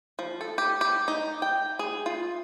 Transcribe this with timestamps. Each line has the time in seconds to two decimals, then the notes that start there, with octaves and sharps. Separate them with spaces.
0.19 F3
0.41 A4
0.58 G4
0.81 G4
1.08 D#4
1.42 G5
1.79 G#4
2.06 F4